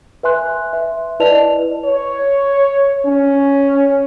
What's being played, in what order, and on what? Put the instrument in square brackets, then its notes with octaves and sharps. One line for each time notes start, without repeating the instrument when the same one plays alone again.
[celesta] B4 E5 G#5 C6 F#6
E5
E4 B4 D5 D#5 A5 F7
[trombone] C#5
C#4